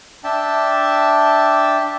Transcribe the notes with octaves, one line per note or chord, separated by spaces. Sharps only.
D4 E5 G5 A5